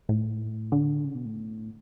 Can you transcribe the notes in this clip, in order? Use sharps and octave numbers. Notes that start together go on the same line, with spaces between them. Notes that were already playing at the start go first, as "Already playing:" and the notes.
A2
D3
C#3
B2
A2